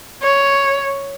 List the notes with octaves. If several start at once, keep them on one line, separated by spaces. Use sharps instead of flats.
C#5